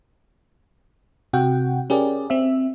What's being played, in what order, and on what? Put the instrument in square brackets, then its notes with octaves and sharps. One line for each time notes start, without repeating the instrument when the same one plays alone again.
[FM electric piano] C3 F#4 F#5 G5
C#4 G4 G#4 A#4 D5
C4 E5